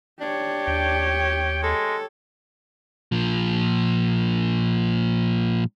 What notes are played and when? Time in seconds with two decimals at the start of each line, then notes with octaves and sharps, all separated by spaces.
0.21 D4 G4 C#5
0.67 D#2 G5
1.63 G#3 A4
3.12 A#2 F3